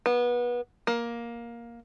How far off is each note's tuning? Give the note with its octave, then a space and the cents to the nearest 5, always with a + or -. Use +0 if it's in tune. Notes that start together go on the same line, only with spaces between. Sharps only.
B3 -25
A#3 +10